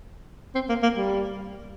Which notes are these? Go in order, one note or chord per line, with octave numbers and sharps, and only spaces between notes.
C4
A#3
A#3
G3